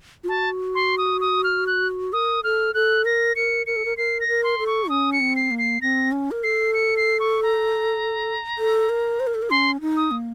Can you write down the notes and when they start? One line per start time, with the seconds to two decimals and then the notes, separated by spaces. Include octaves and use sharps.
0.24 F4
0.29 F#4 A5
0.75 C6
0.98 D#6
1.21 D#6
1.44 F6
1.67 F#6
2.13 A#4 D#6
2.44 A4 F6
2.74 A4 F#6
3.05 A#4 A#6
3.36 A#4 C#7
3.66 A#4 C#7
3.76 A4
3.85 A#4
3.97 A#4 C7
4.21 A#6
4.28 A#4
4.44 C6
4.59 A4
4.67 C#6
4.90 C#4 D#6
5.13 C#7
5.20 C4
5.36 C7
5.51 A#3
5.58 C7
5.82 C4 A#6
6.12 C#4
6.31 A#4
6.43 A4 C7
6.74 C#7
6.97 C7
7.20 C#6
7.43 A#5
8.58 A4
8.89 A#4
9.20 C5
9.27 A#4
9.35 A4
9.42 A#4
9.50 C#4 C6
9.81 D#4
9.97 D#6
10.11 A#3